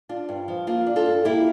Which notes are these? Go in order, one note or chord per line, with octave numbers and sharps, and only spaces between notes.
D4 F4
G2
F3
A#3 F4
D4
F4 A4
G2
A#3 E4 G4